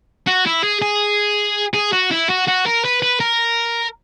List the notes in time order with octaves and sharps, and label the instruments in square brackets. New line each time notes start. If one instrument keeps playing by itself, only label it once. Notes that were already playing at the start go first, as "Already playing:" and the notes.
[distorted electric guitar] F#4
E4
G#4
G#4
G#4
F#4
E4
F#4
F#4
A#4
B4
B4
A#4